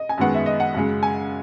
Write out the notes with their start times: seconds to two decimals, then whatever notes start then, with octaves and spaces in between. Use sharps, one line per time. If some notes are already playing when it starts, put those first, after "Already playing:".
Already playing: D#5
0.09 G#5
0.18 F#2 D#3 G#3 B3 F#5
0.34 E5
0.46 D#5
0.60 F#5
0.74 F#2 C#3 G#3
1.03 G#5